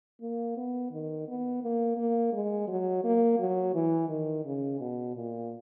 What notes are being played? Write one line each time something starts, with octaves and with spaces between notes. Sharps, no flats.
A#3
B3
D#3
B3
A#3
A#3
G#3
F#3
A#3
F#3
E3
D#3
C#3
B2
A#2